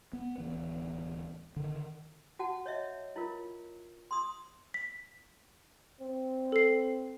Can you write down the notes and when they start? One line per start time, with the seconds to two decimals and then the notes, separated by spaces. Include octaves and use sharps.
0.13 B3
0.38 D1 E3 B3
1.56 D3 D#3
2.39 F#4 F#5 A5
2.66 C#5 D#5 E5
3.16 E4 F4 A#4
4.11 C6 D#6
4.74 B6
6.01 C4
6.52 A4 C7